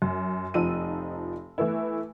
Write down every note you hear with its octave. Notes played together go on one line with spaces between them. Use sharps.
F#2
F1 F3 D#4 E6 D#7
E3 A3 B3 E4